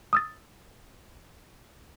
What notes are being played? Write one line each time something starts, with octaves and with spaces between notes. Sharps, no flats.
D#6 E6 A6